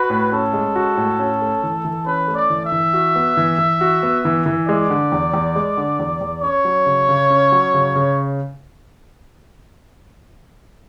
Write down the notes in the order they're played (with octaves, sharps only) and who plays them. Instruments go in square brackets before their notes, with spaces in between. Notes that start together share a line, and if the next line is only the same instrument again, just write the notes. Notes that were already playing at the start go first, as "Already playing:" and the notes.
Already playing: [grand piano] F#4 [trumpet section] B4
[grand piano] A2
[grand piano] C#4 [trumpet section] A4
[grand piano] G#3
F#4
A2
C#4
A3
E3
E3
[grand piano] C#4 [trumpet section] B4
[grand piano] A3
[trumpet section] D5
[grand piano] E3
[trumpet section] E5
[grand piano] E3
F#4
B3
E3
E3
F#4
B3
E3
E3
[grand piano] G#3 [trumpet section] D5
[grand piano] D3
E2
E2
G#3
D3
E2
E2
[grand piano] C#4 [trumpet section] C#5
[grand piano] F#3
C#3
C#3
C#4
F#3
C#3
C#3